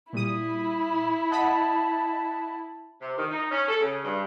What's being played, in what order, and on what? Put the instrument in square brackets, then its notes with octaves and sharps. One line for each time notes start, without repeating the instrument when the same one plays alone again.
[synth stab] A#2 G3 D#6 [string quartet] E4
[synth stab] D#5 F#5 B5 [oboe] A5
[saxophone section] C3
D#3
D#4
C#4
A4
C#3
G2